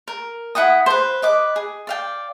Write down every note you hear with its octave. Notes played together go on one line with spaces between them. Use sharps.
A#4
E4 F#5 G5 D#6
B4 C5
B4 D#5 D6
G#4
D5 F5 G5